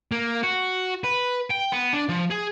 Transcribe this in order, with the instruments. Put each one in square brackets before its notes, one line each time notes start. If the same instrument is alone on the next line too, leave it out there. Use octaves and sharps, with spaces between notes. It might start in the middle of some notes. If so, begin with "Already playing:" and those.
[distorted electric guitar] A#3
F#4
B4
G5
B3
D4
F3
G#4